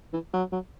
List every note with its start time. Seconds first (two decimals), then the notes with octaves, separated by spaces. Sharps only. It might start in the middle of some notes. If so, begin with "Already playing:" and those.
0.13 E3
0.33 F#3
0.52 F#3